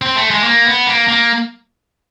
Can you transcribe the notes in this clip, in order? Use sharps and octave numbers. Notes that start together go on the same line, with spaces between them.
C4
A3
G#3
A#3
B3
A#3
A#3